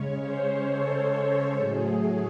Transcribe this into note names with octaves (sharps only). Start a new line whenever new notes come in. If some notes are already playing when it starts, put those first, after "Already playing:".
Already playing: C#3 G#3 C#4 C#5
C5
A4
C5
A2 F#3 A3 G#4